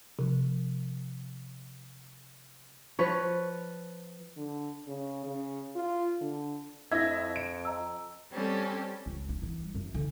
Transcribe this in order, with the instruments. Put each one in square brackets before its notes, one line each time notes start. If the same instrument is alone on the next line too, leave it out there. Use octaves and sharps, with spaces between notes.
[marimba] C3 F3
[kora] F3 B4 C#5
[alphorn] D3
C#3
C#3
F4
D3
[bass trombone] F2 [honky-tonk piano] E4 D#5 E5 [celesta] G#6 A#6
[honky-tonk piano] D7
[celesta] D#5 A#5 E6
[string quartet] G3 C4 C#4 G4 A4
[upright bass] C#2
D4
E3
G3
F#2
D3